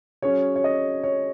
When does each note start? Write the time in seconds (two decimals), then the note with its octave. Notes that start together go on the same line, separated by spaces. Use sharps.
0.22 F#3 C#4 G#4 C#5
0.56 C#5
0.64 D#5
1.03 C#5